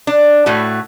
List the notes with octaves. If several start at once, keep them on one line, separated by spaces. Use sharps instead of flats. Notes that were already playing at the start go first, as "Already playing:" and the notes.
D4
A2 A3 F#4